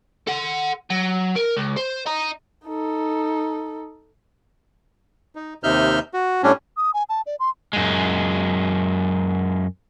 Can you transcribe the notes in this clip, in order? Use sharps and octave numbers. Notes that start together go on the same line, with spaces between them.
A4 F#5
F#3
A#4
C#2
C5
D#5 A#5
D#4 A4
D#4
D#2 C3 D#4 E5 F6 G6
F#4
A2 G3 C#4 D4
D#6
G#5
A5
D5
C6
F#2 G#3